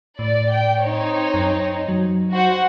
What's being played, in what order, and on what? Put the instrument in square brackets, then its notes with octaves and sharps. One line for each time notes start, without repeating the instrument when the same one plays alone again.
[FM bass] A2 [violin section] D5
[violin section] G5
C4 D#4 C#5
[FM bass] F#2
F#3
[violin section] F#4 C5 F#5